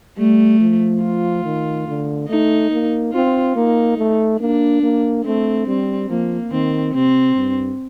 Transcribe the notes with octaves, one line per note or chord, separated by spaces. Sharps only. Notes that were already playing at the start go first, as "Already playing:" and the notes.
G3 A3
F3
F4
D#3
D3
A3 D#4
A#3
C4 F4
A#3 D#4
A3
A#3 D4
A#3
A3 C4
G3 C4
F3 A#3
D#3 C4
C3 C4
G2